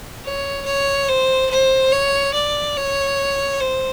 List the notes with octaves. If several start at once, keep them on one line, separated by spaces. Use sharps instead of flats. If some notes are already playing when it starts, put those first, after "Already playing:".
C#5
C#5
C5
C5
C#5
D5
C#5
C5